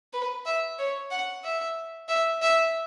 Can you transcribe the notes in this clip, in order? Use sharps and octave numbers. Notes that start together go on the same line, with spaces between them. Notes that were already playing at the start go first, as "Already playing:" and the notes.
B4
E5
C#5
F#5
E5
E5
E5